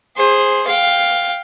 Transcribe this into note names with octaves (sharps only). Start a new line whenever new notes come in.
G#4 C5
F5 G5